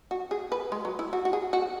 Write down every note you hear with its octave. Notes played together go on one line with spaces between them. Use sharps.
F#4
G#4
B4
G#3
F#3
E4
F#4
F#4
G#4
F#4